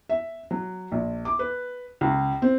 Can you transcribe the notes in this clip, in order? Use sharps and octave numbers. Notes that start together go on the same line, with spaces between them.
E5
F#3
A#1
D6
B4
C#2
C4